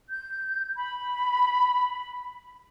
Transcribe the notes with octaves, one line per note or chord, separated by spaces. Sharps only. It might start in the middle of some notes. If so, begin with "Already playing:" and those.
G6
B5